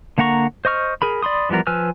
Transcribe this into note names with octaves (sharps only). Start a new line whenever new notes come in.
D3 A#3 F#5 A#5 C#6
C5 D#5 C#6 F6
G#4 A#4 B5
D5 B5 C6 D#6
E3 F3 G3 B3 A#4
F3 B4 G#5 E6 F6